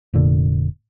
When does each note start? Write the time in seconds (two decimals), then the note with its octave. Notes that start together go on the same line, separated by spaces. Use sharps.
0.14 F1 A#2 D3